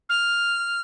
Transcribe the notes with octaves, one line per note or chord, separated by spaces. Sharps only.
F6